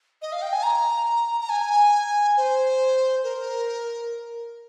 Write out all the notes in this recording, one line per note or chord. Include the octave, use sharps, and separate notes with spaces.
D#5
F5
G5
G#5
A#5
A#5
G#5
C5
A#4